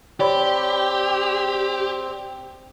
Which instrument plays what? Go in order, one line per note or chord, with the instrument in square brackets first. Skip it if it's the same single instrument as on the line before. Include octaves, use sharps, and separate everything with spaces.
[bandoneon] C4 [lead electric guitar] G4 [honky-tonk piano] C#5 D5 B5